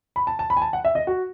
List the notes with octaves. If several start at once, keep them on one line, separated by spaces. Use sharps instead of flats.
B5
A5
A5
B5
G#5
A5
F#5
E5
D#5
F#4